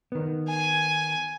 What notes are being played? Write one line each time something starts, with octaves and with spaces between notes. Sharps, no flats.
D#3 B3
G#5